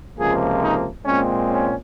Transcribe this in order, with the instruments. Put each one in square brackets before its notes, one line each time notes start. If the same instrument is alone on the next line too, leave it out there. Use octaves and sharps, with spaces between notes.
[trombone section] C#2 C3 F3 A#3 G#4
D#4
A#2 G#3 C4 C#4
C#4